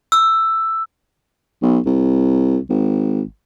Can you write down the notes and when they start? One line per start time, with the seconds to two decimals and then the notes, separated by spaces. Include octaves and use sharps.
0.12 E6
1.63 B1
1.86 C2
2.69 G#1